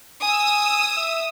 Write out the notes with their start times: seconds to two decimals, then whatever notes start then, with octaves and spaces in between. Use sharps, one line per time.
0.22 G#5 D#6 E6
0.97 E5